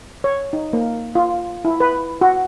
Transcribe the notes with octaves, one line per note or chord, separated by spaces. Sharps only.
C#5
D#4
A#3
F4
E4
B4
F#4